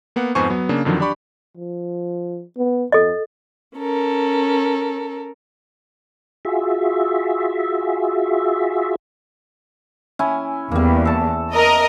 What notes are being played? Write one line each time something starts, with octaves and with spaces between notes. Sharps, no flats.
A#3 B3 F#5
F2 G#2 B3 C5 G#5 C#6
F#3 B3
C#3 A#3 D4
F2 D3 D#3 F3 F#3
D4 G4 D5 B5 C#6
F3
B3
F2 A4 D#5
C#4 A4 A#4
F4 F#4 G#4 E5
C#4 E4 G#5
E2 G3 A#3
A4 A5
A#4 D#5